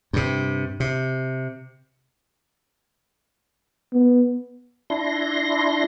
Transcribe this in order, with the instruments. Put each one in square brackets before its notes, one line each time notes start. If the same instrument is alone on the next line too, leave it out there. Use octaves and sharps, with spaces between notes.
[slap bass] G2 C3
C3
[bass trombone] B3
[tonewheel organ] D4 E4 C6 A#6